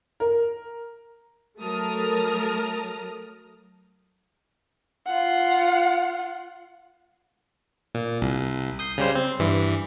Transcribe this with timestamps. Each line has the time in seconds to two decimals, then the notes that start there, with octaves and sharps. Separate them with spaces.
0.20 A#4
1.59 F#3 A3 A#4 A5 D#6 F6
5.06 F4 F#5
7.95 A#2
8.22 C2
8.79 D#6 G6 C7
8.98 C#3 G3 C5
9.15 C4
9.39 G2 E3